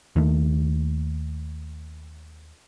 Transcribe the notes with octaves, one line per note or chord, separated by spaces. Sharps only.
D#2 D#3 A3